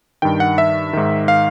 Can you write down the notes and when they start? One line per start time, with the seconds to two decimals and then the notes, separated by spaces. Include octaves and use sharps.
0.22 G2 D#3 G5
0.40 F#5
0.58 E5
0.93 G#2 D#3
1.28 F5